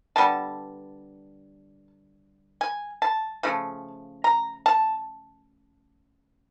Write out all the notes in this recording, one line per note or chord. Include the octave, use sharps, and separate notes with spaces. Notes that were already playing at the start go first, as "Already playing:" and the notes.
D3 G3 B3 A5
G#5
A5
C#3 F3 A3
A#5
A5